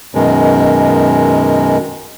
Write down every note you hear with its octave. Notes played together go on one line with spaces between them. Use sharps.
F#2 B2 D#3 G#3